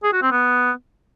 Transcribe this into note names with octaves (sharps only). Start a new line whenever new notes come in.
G#4
F#4
C4
B3